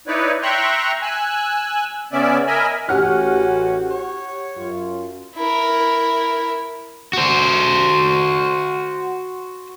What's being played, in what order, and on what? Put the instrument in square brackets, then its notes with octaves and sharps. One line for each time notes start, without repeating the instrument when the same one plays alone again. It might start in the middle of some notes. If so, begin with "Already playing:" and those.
[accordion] D#4 E4 B4 C#5 D5
E5 G5 A#5 C6 C#6 F#6
G#5 E6 F#6
C#3 B3 C#4 D5 E5
A#4 D#5 E5 G#5 B5
[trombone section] A1 F#4 [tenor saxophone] C#4 [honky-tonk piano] G4 F#5 F6
[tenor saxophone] C#5
[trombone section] F#2 F4
[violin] E4 A#4
[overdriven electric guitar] F#4 C5